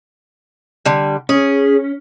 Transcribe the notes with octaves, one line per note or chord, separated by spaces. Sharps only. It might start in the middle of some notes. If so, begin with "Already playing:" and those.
D3 G3
C#4 G#4